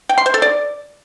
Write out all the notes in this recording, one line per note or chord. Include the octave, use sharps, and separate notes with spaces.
G5
C6
C5
A4
D5